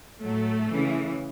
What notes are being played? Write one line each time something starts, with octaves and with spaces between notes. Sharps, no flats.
A2 F#3 A3
C#3 E3